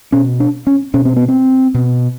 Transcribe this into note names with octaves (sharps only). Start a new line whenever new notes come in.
B2 C#4
D4
C#4
B2 C#4
C4
B3
C4
B2